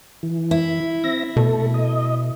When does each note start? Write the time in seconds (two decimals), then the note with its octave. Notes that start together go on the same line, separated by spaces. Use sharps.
0.23 E3
0.51 E4
1.04 C4 E5 A#6
1.36 B2 A3 A4
1.74 D#5